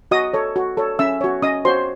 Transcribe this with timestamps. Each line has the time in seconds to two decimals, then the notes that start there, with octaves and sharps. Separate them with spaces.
0.11 F#4 D#5 D#6
0.34 A4 C#5
0.56 F#4
0.77 A4 C#5
0.99 C#4 E5 E6
1.21 F#4 C#5
1.42 C#4 D#5 D#6
1.65 F#4 C5 C#5 C6